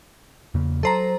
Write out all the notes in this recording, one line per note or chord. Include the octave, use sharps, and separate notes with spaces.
E2 C#3 A#3
F#3 A4 C5 A#5